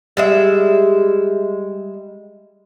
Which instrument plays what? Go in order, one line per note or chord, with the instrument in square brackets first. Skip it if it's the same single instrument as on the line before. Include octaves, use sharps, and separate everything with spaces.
[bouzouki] G3 G#3 E5